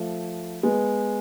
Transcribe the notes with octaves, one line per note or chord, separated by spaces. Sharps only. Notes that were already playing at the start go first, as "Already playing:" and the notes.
Already playing: F3 A3
G#3 B3